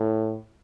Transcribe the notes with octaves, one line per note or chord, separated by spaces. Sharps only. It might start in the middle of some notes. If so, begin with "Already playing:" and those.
Already playing: A2